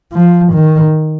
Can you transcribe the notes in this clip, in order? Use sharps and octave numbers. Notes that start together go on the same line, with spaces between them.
F3
D#3